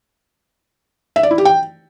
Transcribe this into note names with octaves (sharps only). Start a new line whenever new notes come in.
E5
D5
E4
G4
G5